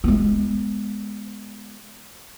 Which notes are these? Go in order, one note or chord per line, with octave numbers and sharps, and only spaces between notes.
G#3 B3